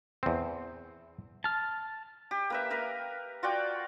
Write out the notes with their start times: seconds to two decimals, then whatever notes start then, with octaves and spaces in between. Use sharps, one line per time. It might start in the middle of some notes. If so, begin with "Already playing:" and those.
0.23 E2 C4
1.44 A5 F6
2.31 G4
2.50 A#3 B4 E5
2.71 A#4 B4 F5
3.43 F4 F#4 D5 G5